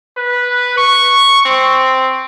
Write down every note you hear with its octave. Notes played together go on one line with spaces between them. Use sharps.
B4
C#6
C4